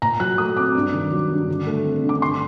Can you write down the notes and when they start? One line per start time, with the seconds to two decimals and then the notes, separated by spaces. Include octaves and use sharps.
0.02 A#2 A#5
0.20 F#3 F#6
0.38 A3 D#6
0.57 C4 D6
0.75 G2
0.94 D#3
1.11 F#3
1.29 G2
1.48 D3
1.66 A3
1.85 C4
2.04 D3
2.09 D6
2.22 G2 C6